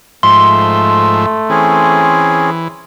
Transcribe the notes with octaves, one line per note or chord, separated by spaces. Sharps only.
G#2 F3 A3 E5 C6
E3 C4 C#4 G#4